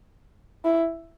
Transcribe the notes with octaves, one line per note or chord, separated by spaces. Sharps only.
E4